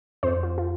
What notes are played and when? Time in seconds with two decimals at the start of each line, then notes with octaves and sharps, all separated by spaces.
0.23 F2 C5
0.43 F4
0.58 F4